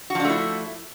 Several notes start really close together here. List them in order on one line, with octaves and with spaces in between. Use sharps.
F#4 F3 D4 A3 E4